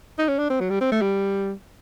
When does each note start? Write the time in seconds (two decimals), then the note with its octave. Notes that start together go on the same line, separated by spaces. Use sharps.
0.19 D#4
0.29 C#4
0.39 D4
0.50 C4
0.60 F#3
0.70 G3
0.81 C4
0.92 A3
1.02 G3